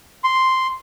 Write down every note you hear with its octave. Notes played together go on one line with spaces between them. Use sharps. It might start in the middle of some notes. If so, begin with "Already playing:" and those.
C6